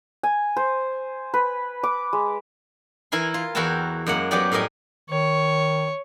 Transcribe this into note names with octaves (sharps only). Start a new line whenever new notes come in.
G#5
C5
B4
D6
G#3
E3 E4 A#4 G#5 C6
F4
E2 E4 F#4 A#4 G5 A5
F#2 G#3 A#3 F#5
F#2 F#3 B3 G4 D5
A2 G3 A#4 D#5 G#5
D#3 C#5